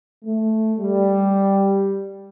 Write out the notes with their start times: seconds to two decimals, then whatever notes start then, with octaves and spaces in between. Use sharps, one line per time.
0.24 A3
0.78 G3